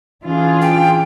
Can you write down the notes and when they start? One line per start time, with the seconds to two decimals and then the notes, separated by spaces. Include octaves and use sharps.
0.25 E3 C#4 D4 F4 G#4
0.61 G5